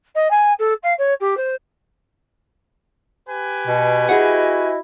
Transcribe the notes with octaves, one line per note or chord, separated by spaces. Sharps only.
D#5
G#5
A4
F5
C#5
G4
C5
G4 B4 G#5
B2
E4 F#4 G#4 D#5 F#5